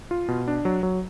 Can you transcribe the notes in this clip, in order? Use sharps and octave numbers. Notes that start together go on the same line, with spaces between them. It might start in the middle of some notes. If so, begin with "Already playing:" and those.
F4
B2
D4
F#3
F#3